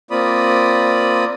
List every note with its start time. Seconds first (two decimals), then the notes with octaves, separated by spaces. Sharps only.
0.11 A#3 C4 F4 D5 B5 D#6